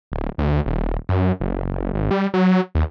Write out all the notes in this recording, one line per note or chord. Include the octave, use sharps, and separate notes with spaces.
D1
D2
D#1
F#2
F#1
G#1
G3
F#3
D#2